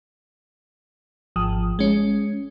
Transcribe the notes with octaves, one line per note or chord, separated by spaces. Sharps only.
G#1 F3 D#6
G#3 C#4